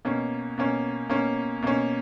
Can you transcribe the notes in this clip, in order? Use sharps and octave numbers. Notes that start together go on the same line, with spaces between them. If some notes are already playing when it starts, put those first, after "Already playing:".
B2 A#3 C#4
B2 A#3 C#4
B2 A#3 C#4
B2 A#3 C#4